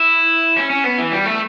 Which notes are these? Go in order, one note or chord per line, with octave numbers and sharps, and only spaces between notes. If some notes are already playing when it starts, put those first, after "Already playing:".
Already playing: E4
C#4
C#4
B3
E3
G3
A3